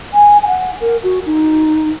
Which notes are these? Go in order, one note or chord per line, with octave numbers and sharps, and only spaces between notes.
G#5
G#5
F#5
A#4
F#4
D#4